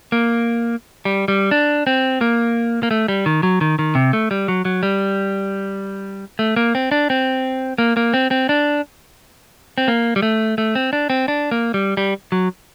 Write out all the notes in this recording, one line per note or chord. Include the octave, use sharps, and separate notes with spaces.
A#3
G3
G3
D4
C4
A#3
A#3
A3
G3
D#3
F#3
D#3
D#3
C3
A3
G3
F#3
F#3
G3
A3
A#3
C4
D4
C4
A#3
A#3
C4
C4
D4
C4
A#3
G3
A3
A3
C4
D4
C4
D4
A#3
G3
G3
F#3